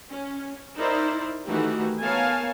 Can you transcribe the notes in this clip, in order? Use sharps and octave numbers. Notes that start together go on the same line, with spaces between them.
C#4
D#4 E4 A#4 C5 D5
D#3 E3 A3 D#4 F#4 G4
B3 A#4 C#5 F5 G#5 A5